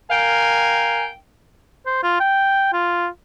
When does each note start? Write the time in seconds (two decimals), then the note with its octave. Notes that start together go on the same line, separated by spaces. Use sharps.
0.10 A#4 F5 G5 G#5
1.87 C5
2.03 F4
2.20 G5
2.73 F4